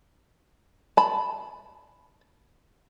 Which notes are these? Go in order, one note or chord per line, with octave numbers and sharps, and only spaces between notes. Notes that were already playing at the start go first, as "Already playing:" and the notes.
A5 B5